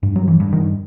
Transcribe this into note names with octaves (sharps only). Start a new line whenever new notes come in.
G2
F#3
E3
G2
D#3